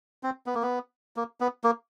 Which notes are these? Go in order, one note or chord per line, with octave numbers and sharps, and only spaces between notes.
C4
B3
A#3
B3
A#3
B3
A#3